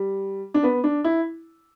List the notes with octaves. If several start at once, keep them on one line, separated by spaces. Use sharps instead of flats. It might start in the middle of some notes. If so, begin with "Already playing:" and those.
Already playing: G3
D4
B3
D4
E4